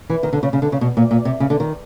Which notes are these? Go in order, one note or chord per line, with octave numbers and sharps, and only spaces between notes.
E3
D#3
D3
C#3
C#3
D3
C#3
B2
A#2
A#2
C3
C#3
D3
D#3